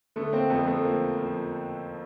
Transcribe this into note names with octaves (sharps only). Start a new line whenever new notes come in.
D3 A3 B3
A#3 C4
F2 A3 B3
A3 B3
F3 A#3
F3